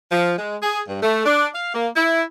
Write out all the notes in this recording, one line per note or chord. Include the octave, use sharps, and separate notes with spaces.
F3
G#3
G#4
G2
A3
D4
F5
A#3
E4